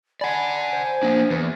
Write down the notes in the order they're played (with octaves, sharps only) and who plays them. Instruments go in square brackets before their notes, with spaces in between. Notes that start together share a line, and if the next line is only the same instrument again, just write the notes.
[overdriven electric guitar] D5 F#5 [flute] G#5 [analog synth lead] B5
[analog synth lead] C5
[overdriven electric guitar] A#3 D4
[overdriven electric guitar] E2 [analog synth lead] B4